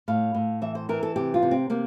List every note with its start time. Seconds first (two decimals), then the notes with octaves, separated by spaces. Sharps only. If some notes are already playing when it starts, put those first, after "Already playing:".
0.08 A2 F5
0.35 A2
0.62 E3 E5
0.75 C5
0.89 E3 A#4
1.03 A4
1.16 C3 G4
1.34 F4
1.43 C3
1.51 C4
1.70 C3 A#3